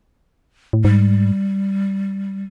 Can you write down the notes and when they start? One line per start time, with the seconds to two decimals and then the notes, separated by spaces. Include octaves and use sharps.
0.73 A2
0.84 G#2 G3